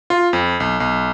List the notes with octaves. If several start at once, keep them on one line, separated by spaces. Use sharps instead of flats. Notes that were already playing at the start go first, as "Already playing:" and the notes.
F4
F2
B1
B1